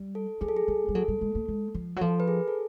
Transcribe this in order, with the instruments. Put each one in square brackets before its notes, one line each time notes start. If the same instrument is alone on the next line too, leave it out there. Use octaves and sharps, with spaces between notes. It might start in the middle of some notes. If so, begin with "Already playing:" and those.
Already playing: [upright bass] G3
[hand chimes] A4
[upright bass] F#3 [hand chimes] G#4
[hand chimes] A4
G#4
[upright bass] G3 [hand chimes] G#4
[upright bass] G3
[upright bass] F#3 [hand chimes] A4
[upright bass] G3
G#3
A3
G#3
F3
F#3
[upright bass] F3 [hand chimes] A4
[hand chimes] B4
G#4 A#4
A4